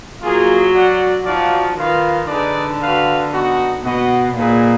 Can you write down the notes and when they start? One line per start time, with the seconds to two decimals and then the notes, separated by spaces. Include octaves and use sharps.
0.21 F#3 A#3 F4 G#4
0.73 F#4 D5 F#5
1.24 F3 D#4 F#4 D5 F5
1.76 D#3 F4 B4 F5
2.27 D3 D#4 G#4 B4 D5
2.80 F#4 B4 F5
3.31 B3 D#4 F#4
3.83 B2 F#4 B4 D#5 F#5
4.34 A#2 D#4 G#4 B4